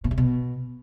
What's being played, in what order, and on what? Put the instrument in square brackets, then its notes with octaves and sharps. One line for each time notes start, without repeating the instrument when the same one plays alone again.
[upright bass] A#2
C3
B2